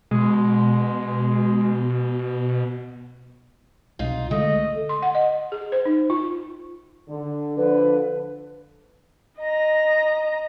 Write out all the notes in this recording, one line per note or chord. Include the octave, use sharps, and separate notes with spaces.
B2 G#3
C2 B2 D#4 F4
D3 G#3 A3 D#5
C6
F#5
D#5
G#4
C5
D#4
F4
D3
D3 F3 B4
D#5 A#5